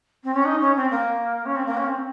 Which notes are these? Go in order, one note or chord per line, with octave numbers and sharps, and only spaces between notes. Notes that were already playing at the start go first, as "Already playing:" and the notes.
C4
C#4
D#4
C#4
C4
A#3
C#4
C4
A#3
C#4
C4